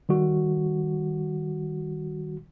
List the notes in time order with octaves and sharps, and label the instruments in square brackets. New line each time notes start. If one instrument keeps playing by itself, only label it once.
[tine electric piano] D#3 G3 F#4